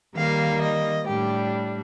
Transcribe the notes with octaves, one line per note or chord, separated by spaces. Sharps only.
D#3 G3 A#3 F5
D#5
A2 G3 D4 G4